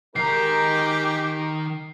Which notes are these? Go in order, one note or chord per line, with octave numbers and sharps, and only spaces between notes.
D#3 G#3 D#4 G4 A#4 A#5 C7